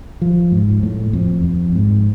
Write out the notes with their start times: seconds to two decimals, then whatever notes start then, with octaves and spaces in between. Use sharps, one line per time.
0.22 F3
0.52 G#2
0.83 A2
1.13 F2
1.44 F2
1.75 G#2